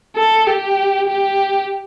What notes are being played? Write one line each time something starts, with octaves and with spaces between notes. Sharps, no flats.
A4
G4
G4